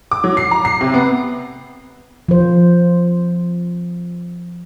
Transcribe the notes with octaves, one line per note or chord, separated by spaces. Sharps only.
D6
F#3
C7
A#5
C7
C3
B3
F3 C5